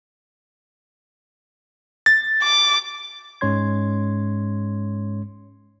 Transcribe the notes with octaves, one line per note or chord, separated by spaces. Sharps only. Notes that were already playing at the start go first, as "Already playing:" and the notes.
A6
D6
G#2 G#3 C#4 C#5 C6 G#6